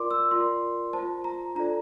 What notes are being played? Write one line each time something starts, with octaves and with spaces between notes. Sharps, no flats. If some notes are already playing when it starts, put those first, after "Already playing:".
Already playing: F4 A#4 D5 C6 D6
E6
F4 A#4 D5 C6
C5 A5
F4
A#5
D4 F4 A4 D5 A#5